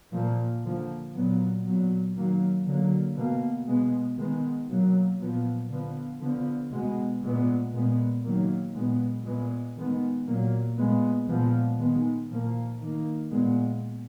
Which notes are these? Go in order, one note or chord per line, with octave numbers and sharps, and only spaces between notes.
A#2 F3 A#3
D3 F3 A#3
A#2 F#3 B3
A#2 F#3 B3
D#3 F#3 A#3
D3 F#3 A#3
B2 A#3
B2 G#3 B3
D#3 G#3 B3
B2 F#3 A#3
A#2 F3 B3
D3 F3 B3
D3 F3 B3
B2 G#3 B3
A#2 G#3 B3
A#2 G#3 B3
D#3 F#3 A#3
A#2 G#3 B3
A#2 G#3 B3
D#3 G#3 B3
A#2 F#3 A#3
A#2 G#3 B3
A#2 F3 G#3 B3
D#3 G#3 B3
A#2 F3 A#3
D#3 A#3
A#2 G#3 B3